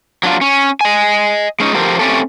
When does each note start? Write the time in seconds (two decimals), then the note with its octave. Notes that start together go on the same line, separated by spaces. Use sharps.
0.23 F#3 D4 F4
0.41 C#4
0.81 D#5 G#5
1.60 G#3 C#4 D#4
1.75 F3 G4 A4 A#4 C5
1.99 A3 C4 C#4 G4 A4